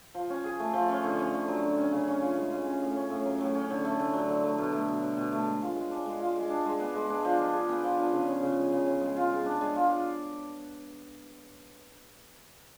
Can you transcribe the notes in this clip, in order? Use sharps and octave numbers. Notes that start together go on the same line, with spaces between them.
F3
C#4
G#4
A3
F3
C#4
D3
C#4
D3
F#3
D3
C#4
C#3
C#4
F4
G#3
C#3
C#4
A2
C#4
A2
F#3
A2
C#4
D3
A3
D3
F#3
D3
A3
B2
A3
B2
F#3
B2
A3
G#3
F4
G#3
D4
G#3
F4
G#3
D4
G#3
B3
G#3
D4
F3
D4
G#4
B3
F3
D4
C#3
C#4
C#3
G#3
C#3
C#4
G#3
F4
G#3
D4
G#3
F4